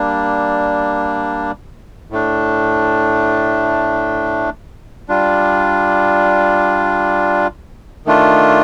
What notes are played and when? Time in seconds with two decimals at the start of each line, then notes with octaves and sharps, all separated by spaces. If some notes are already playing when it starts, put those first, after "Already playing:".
Already playing: G3 A#3 D4
2.11 A2 A3 D4
5.09 G3 D4 F4
8.06 D#3 A3 D4 F4